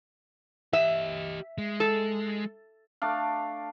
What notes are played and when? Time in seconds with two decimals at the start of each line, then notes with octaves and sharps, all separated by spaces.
0.73 G4 D#5 E5
1.58 G#3
1.80 A4
3.02 A3 D4 D5 F5